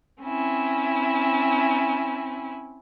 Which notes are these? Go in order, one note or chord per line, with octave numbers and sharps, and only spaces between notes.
C4 C#4 E4